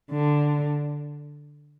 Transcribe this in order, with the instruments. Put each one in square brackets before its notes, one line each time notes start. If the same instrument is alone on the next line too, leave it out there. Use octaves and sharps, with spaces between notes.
[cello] D3